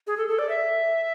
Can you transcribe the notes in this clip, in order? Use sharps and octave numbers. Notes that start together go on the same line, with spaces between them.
G#4
A4
A4
D5
E5